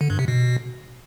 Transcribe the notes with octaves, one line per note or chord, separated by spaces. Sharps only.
D3
G2
C3
B2